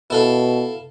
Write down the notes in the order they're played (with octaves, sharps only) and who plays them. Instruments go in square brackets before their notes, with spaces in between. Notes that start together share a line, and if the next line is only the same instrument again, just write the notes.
[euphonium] B2 [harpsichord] E4 A4 F5